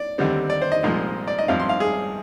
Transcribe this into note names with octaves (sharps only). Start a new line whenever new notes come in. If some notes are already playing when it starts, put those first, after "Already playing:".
Already playing: D5
D#2 D3 G3 C4
D5
C5
D#5
C2 A#2 F3 G#3
D5
D#5
G#1 G2 F3 C4 F5
C6
F5
G#4